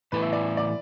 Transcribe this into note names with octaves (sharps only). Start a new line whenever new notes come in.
A2 E3 B3 E4 A4 B4
E5
D5
D5